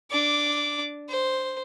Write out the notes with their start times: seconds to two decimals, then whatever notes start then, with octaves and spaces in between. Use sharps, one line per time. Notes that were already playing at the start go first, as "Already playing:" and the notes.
0.10 D4 D6
1.09 C5